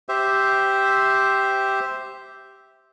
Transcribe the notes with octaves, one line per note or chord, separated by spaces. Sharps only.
G4 C5 E5